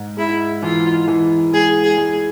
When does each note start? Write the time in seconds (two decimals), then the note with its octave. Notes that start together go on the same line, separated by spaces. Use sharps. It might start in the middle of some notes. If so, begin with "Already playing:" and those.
Already playing: G#2
0.17 G#3 E4
0.62 E3 F4
1.08 E3
1.53 G#3 G#4
1.83 G#4
1.98 G#3